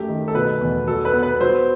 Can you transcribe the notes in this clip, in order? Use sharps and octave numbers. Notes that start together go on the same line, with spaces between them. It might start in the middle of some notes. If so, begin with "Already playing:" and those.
Already playing: F#2 A3 G4
D#3
A4
B2 B4
E2
F#3 A4
B4
B3
B4
F#3 C5